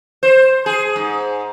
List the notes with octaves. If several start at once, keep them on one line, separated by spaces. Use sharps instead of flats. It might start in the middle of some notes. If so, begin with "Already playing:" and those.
C5
G#4
G#2